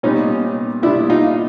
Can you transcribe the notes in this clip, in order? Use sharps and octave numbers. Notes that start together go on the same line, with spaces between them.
A#2 G3 B3 C#4 D#4
A#2 G3 B3 D4 E4
D#4 F4